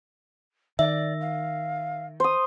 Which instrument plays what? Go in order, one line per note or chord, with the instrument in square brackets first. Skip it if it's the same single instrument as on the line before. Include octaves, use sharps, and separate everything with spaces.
[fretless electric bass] D#3 [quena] D5 [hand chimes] E5
[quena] F5
[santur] C5 D#6